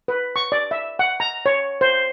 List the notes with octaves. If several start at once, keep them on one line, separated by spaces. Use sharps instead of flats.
B4
C#6
D5
E5
F#5
A#5
C#5
C5